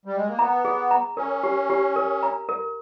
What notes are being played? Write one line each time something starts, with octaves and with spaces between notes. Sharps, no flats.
G3
G#3
A#3
B3 A#5
G#4
A#5
C#4 A#4
G4
G4
A#4
A#5
A#4